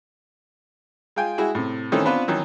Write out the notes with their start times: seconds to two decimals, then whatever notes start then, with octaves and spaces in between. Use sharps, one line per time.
1.16 G#3 F4 G5 G#5
1.38 G#3 E4 F#4 G#4
1.55 A2 C3
1.92 D#3 E3 A3 C4 C#4
2.05 B3 C4 D4 F4 B4
2.28 D#3 E3 F#3